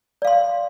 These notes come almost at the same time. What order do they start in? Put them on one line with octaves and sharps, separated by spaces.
D5 F5 C6